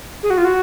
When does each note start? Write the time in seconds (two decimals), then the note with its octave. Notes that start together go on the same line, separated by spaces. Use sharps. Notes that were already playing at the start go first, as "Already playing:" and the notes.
0.23 G#4
0.30 F#4
0.38 F4
0.45 F#4